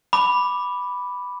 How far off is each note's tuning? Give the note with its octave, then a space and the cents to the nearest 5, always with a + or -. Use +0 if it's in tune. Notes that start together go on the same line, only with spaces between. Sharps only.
B5 +0 D6 +0